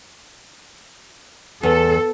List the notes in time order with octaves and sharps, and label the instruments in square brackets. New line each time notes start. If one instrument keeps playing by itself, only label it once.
[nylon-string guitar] E2 [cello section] A4